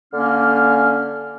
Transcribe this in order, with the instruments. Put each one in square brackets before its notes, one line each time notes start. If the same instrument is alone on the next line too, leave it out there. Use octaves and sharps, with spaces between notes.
[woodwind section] D3 A#3 C#4 F6